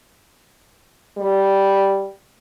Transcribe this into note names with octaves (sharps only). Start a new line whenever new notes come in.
G3